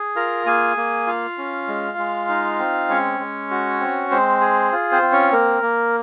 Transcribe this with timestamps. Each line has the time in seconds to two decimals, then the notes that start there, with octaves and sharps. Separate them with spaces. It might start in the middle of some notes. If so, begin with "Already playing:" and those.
Already playing: G#4
0.16 F4 A#4 A#5
0.46 A#3 G#4 G#5
0.77 A#3
1.07 F4 F5
1.38 C#4
1.68 G#3
1.98 G#3
2.29 D#4
2.59 C4
2.89 G#3 C#4 C#5
3.19 G#3
3.51 F#4
3.80 C4
4.11 G#3 C4 C5
4.41 G#4
4.72 F4
4.92 C4 C5
5.02 C4
5.12 C#4 C#5
5.32 A#3 A#4
5.62 A#3